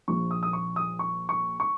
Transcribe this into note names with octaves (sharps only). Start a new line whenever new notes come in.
A#1 A#2 F3 C#6
D#6
D#6
C#6
D#6
C#6
C#6
C#6